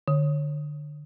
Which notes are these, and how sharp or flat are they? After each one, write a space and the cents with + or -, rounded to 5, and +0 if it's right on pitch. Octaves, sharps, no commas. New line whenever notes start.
D3 +20